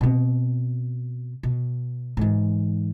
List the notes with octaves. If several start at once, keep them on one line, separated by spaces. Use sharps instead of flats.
B2 C4
B2
G#2 E3